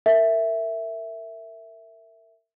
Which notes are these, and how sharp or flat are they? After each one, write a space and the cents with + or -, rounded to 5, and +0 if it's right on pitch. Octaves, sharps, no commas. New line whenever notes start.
A#4 -25 E5 +0